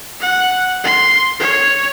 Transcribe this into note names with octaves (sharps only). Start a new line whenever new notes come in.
F#5
C6
C#5